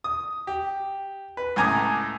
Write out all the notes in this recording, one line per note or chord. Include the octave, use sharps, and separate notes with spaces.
D#6
G4
B4
C#2 A2 G#5 A#5 D6 D#6